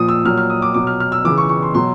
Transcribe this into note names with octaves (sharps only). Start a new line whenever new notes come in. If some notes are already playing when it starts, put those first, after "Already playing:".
Already playing: A#2 F3 D#6
E6
A#2 F#3 F6
F6
D#6
D6
B2 F#3 D6
F6
F6
E6
C#3 E3 D6
C#6
C#6
C6
B2 F#3 C6